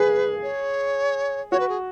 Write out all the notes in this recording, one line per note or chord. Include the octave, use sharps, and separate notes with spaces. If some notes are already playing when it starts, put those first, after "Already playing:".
Already playing: G#4 B4
C#5
F#4 C#5
B4
G#4